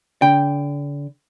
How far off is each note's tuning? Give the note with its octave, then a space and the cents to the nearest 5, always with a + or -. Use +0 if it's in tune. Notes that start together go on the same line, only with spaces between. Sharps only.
D3 -35 G5 +0